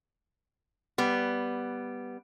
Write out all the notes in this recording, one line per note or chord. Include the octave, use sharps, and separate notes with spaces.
G3 B3